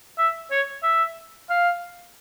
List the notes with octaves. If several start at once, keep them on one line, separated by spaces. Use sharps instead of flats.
E5
C#5
E5
F5